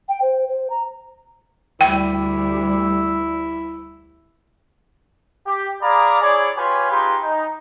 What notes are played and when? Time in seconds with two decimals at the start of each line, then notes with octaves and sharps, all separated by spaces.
0.09 G5
0.22 C5
0.48 C5
0.70 A#5
1.81 D2 G3 E4 G5
5.47 G4
5.82 G#4 D5 F5 A#5 B5 D6
6.21 E4 G#4 C#5 D5
6.58 F4 G4 B4 C#5 G#5 C6
6.91 D#4 F4 G4 G#4 B4 C6
7.23 D#4